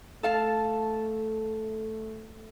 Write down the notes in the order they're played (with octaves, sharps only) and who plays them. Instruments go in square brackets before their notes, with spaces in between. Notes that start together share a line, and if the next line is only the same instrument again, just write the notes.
[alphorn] A3 [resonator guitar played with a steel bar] A4 F5 A5